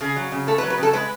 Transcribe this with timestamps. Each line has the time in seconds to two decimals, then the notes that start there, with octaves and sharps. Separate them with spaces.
0.01 C#3 G#4
0.16 F#3
0.32 C#3
0.47 A3 A4
0.58 B4
0.63 F#3
0.70 B4
0.78 C#3
0.83 A4
0.93 G#3 B4